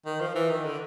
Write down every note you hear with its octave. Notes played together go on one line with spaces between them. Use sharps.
D#3
F3
E3
D#3
D3